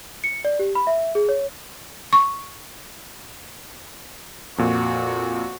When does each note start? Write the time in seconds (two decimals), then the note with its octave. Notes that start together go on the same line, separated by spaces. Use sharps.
0.24 C#7
0.45 D5
0.59 G4
0.75 B5
0.87 E5
1.15 G#4
1.29 C#5
2.13 C#6
4.58 F2 A#2 F#4